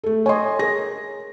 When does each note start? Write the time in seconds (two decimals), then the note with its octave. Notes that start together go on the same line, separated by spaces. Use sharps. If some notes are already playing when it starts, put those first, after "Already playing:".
0.04 A3 A4
0.26 C#5 D#5 G#5 C6
0.59 G#4 A#4 A#6